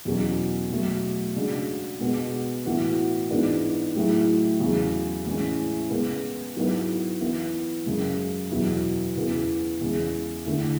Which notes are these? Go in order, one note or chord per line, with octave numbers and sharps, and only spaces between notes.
E2 B2 F#3 C#4
B2 F#3 A3
C#3 G#3 D4 F#4
B2 G#3 B3 F#4
A2 E3 B3 F#4
G#2 E3 B3 D4
A2 F#3 A3 E4 G#4
E2 C#3 F#3
A2 E3 G#3 C#4
C#3 G#3 B3
G#2 F#3 B3 E4 B4
E3 B3 E4
F#2 C#3 G#3
E2 B2 F#3 B3 E4
E2 C#3 E3 B3 E4
E2 C#3 G#3
D3 A3 E4